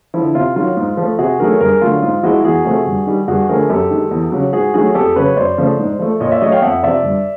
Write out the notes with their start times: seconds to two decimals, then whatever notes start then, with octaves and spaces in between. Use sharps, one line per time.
0.14 D3 F3 E4
0.35 C3 F4
0.56 D#3 F#3 F4
0.77 G#2
0.97 F3 A3
1.19 C3 F#4 G#4
1.40 D#3 F#3 A3 G#4 A#4
1.60 G2 G#4 A#4
1.81 D3 F#3 A3 F4
2.02 G#2 F4
2.23 F3 G#3 E4 F#4
2.44 E2 F#4 G#4
2.65 C3 F3 A3
2.86 G2
3.07 D#3 G3
3.28 G2 F#4 G#4
3.49 D3 F3 A3 G#4 A#4
3.70 F#2 G4 A4
3.91 D#3 G#3
4.11 E2
4.32 C#3 F#3
4.53 G#2 F#4 G#4
4.74 D#3 F#3 A3 F#4 G#4
4.95 F2 G4 A4
5.16 C#3 F#3 B4 C#5
5.37 F#2 C5 D5
5.58 C#3 F3 A3
5.79 G#2
5.99 F3 A3
6.20 A#2 C#5 D#5
6.31 D5 E5
6.41 F#3 A3 C#5 D#5
6.52 F5 G5
6.62 F2 E5 F#5
6.83 C3 F3 D5 E5
7.04 G2